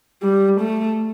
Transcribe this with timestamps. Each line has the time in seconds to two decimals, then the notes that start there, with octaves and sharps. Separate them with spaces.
0.22 G3
0.60 A3